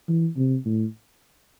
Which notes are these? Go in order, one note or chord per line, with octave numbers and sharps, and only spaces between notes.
E3
C3
A2